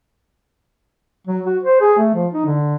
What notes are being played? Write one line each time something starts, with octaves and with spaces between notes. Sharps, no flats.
F#3
F#4
C5
G#4
A3
F3
D#4
D3